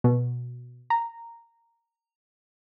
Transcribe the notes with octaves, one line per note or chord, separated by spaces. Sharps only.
B2
A#5